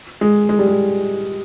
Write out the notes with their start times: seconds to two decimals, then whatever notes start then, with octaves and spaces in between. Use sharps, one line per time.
0.21 G#3
0.49 G#3
0.59 G3
0.67 G#3